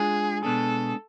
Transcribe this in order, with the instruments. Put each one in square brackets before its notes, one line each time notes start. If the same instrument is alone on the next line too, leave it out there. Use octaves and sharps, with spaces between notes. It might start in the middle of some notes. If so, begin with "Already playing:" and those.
Already playing: [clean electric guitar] G#3 D4 F4 [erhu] G#4
[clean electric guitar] B2 G#3 B3 D4 G#4 [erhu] A4